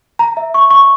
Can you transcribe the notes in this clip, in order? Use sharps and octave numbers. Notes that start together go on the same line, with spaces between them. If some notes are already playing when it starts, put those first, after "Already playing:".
A#5
E5
C#6
C#6